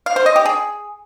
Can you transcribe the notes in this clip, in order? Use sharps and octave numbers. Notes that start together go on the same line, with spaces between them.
F5
C5
D#5
G4
G#4